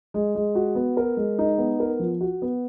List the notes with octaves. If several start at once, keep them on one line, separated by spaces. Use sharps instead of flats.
G#3
G#3
F#4
B3
A#4
G#3
D#4
B3
A#4
F3
F#4
B3